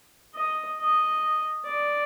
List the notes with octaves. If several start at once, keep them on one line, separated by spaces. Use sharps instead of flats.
D#5
D#5
D5